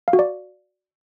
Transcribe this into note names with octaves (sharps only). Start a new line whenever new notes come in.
F5
F#4
D5